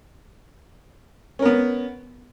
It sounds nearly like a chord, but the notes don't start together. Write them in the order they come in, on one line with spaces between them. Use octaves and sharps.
C#4 A#4 B3